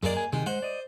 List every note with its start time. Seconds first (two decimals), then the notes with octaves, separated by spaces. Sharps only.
0.03 F#2 G#3 A#3 G#4 D5
0.17 G#5
0.33 C3 D#3 G#3
0.46 G#3 C5 D#5 F#5
0.62 D5 D#5